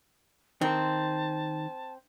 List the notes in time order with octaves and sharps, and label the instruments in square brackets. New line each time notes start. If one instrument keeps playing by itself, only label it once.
[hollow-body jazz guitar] D#3 A#4 [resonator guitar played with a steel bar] C4 [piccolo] A5